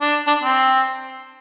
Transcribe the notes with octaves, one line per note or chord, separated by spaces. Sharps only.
D4
D4
C4